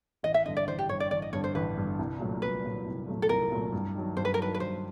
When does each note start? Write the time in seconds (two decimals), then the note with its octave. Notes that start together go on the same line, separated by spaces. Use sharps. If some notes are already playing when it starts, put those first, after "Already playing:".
0.23 A1 D#5
0.34 E5
0.46 G2 D3 D#5
0.57 D5
0.67 A1 C5
0.79 G4
0.89 G2 D3 C#5
1.00 D5
1.11 A1 D5
1.22 D#5
1.33 G2 D3 C#5
1.44 C5
1.55 A1 B4
1.77 G2 D3
1.99 C2
2.20 A#2 F#3 A3
2.42 C2 B4
2.64 A#2 F#3 A3
2.86 C2
3.08 A#2 F#3 A3
3.22 A4
3.29 C2 A#4
3.52 A#2 F#3 A3
3.72 G2
3.95 D#3 F#3
4.17 G2 C5
4.25 B4
4.34 A#4
4.39 D#3 F#3 B4
4.55 B4
4.60 G2 C5